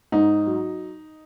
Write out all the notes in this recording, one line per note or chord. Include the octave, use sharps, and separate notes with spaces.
G#2 D#4
F#3